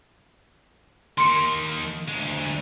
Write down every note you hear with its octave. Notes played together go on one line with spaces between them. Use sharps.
D#3 A#3 C6 C#7
D2 G#3